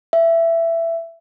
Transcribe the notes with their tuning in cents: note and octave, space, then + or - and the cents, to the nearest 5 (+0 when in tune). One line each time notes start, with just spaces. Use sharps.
E5 +15